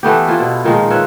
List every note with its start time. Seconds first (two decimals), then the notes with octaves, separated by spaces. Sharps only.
0.03 E3 A3 B3 G4
0.27 D4 E4 F4 C5
0.40 B2
0.64 A#2 D#3 F3 G#3
0.90 F4 B4 C#5 E5